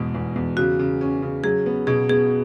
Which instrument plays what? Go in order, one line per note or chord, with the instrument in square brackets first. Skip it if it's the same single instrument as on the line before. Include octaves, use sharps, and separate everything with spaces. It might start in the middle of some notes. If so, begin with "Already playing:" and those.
Already playing: [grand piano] E2 G#2 B2
E2
E2
[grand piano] C#3 [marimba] F#4
[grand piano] C#3
C#4
C#3
[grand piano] F#3 [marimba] G#4
[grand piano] B3
[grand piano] B2 [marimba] G#4
[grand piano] B3 [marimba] G#4